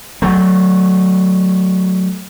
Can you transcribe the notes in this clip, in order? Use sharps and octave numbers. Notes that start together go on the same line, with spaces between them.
F#3 A3